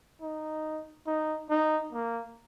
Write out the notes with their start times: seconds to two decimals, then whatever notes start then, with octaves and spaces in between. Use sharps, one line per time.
0.22 D#4
1.07 D#4
1.50 D#4
1.93 A#3